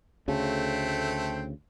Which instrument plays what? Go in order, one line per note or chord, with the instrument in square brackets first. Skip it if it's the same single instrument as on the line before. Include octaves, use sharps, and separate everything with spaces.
[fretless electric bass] D2 C#3 [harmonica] A3 C4